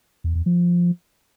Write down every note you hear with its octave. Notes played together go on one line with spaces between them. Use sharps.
E2
E2
F3